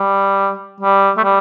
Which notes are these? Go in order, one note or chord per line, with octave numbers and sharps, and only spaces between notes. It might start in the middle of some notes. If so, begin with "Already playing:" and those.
Already playing: G3
G3
A3
G3